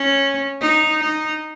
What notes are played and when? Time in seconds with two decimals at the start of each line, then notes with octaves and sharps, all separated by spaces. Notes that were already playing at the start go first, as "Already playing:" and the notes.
Already playing: C#4
0.60 D#4
1.00 D#4